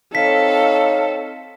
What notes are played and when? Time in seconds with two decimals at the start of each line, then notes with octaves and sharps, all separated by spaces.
0.15 C4 D#4 A4 C#5 F5 B6